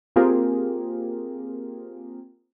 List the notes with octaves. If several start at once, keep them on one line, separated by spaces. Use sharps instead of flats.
A#3 C4 F4 G4 G#4 A#4